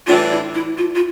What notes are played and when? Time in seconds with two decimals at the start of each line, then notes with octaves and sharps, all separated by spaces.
0.07 A2 E3 G3 D4 F4
0.31 E4
0.54 E4
0.78 F4
0.95 F4